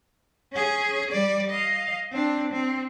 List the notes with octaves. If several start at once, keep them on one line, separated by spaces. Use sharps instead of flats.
C#4 G#4
G3 D5
D#5 F5
C4 D4
C4